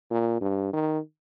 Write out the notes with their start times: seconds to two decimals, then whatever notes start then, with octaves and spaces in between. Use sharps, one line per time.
0.10 A#2
0.41 G2
0.73 D#3